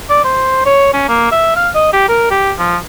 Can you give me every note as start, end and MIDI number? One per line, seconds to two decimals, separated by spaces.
0.10 0.21 74
0.24 0.63 72
0.66 0.94 73
0.94 1.05 61
1.09 1.30 58
1.32 1.54 76
1.56 1.70 77
1.75 1.92 75
1.93 2.09 67
2.09 2.29 70
2.31 2.52 67
2.58 2.77 53